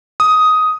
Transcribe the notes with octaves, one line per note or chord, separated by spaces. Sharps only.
D#6